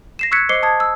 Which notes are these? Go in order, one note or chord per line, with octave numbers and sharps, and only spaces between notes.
A#6 C7 E7
C#6 E6 F#6 G#6 B6 C#7
C5 D#5 D6 C7 C#7 G7
A5 D#6 G#6
E6